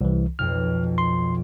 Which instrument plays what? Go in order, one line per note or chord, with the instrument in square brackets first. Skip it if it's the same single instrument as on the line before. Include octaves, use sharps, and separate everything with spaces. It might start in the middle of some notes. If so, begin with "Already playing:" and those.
[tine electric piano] C2 E3
[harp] B1 F2 [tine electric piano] F6
[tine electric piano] C6